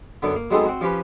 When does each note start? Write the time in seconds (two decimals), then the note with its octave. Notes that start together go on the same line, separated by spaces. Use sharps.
0.22 F#2 D3 B3
0.35 A#3
0.50 F#3 G#3 B3 C4 D#4 A4
0.65 C4 F#4
0.81 F3 C#4 G4 B4